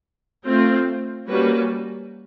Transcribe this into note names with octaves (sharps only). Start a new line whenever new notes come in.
A3 C4 F4
G3 A#3 C#4 F#4 B4